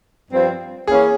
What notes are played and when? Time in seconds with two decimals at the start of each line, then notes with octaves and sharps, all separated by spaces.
0.31 G2 F3 C4
0.87 E3 A#3 C#4 G#4